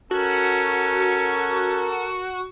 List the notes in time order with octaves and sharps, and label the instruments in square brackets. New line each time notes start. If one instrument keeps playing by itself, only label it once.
[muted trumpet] C#4 [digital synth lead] F#4 [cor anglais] A4 [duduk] A#4